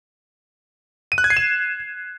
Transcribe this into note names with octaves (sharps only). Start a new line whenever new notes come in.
D#7
F#6
G#6
C7
E7